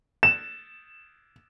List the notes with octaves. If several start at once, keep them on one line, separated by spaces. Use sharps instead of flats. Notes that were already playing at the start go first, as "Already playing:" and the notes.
E7